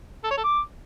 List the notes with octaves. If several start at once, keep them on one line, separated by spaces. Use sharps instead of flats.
A4
C#5
A4
D6